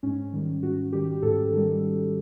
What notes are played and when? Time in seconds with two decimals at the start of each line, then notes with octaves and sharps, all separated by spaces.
0.03 G#2 C#4
0.33 D#3 G3
0.63 G#2 F#4
0.92 D#3 G3 G4
1.22 G#2 A4
1.52 D#3 G3